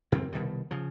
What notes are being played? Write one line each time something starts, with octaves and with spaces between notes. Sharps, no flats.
F#2 E3 B3 C4
C2 B2 D#3 G3
C#3 F3